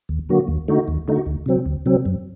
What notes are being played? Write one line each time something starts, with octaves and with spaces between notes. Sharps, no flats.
D#2
D3 F#3 A#3 F#4
D#2
D3 A3 D#4 F#4
D#2
D3 A3 D#4 F#4
D2
C3 F#3 C4
D2
C3 F#3 C4
F#2